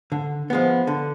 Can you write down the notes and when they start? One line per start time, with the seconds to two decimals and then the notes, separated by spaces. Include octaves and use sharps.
0.12 D3
0.50 F3 G#3 B3
0.87 D3